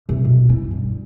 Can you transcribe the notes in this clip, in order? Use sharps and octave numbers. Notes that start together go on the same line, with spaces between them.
C3
B2
E4
G2